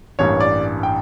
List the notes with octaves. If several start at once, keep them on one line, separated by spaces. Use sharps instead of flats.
A1 G2 E3 G3 A#3 C#5
D5
G5